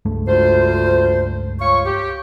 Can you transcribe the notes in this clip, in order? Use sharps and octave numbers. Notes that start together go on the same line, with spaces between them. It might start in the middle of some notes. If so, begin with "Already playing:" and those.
C#2 G2 A3
D2 F4 C5
F4 C#5 C#6
G4